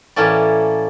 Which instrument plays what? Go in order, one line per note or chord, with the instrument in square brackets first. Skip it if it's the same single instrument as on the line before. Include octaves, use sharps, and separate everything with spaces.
[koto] A2 E3 A#3 C#4 A4 D5